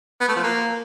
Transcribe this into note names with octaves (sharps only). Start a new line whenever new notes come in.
B3
A3
F3
A#3